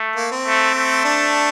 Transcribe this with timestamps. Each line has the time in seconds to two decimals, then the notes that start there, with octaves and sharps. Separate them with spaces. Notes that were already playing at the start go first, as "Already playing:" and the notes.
Already playing: A3
0.16 A#3
0.31 C4
0.46 A3
0.74 A3
1.05 D4